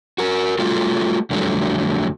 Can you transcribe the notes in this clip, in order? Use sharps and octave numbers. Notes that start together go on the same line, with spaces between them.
F#4 A#4
F#3 G3 A3 F4 F#4 A4
F2 D3 F#3 G3 A3